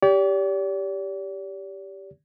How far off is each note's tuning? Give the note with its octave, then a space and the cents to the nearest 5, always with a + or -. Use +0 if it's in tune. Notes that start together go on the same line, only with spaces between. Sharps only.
G4 +0 D5 -40